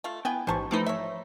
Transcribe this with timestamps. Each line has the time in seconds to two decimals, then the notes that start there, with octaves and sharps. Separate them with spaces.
0.04 A3 F4
0.25 B3 E4 G5 G#5
0.47 A1 G#2 E3 C5 A5 C#6
0.71 C3 F3 A3 D#4 B4
0.86 C#5 E5